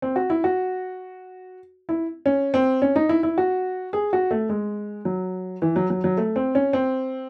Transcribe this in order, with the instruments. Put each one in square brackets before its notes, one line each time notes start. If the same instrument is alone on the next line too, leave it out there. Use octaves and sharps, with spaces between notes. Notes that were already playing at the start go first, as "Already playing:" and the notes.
[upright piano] C4
F#4
E4
F#4
E4
C#4
C4
C#4
D#4
E4
E4
F#4
G#4
F#4
A3
G#3
F#3
E3
F#3
F#3
F#3
A3
C4
C#4
C4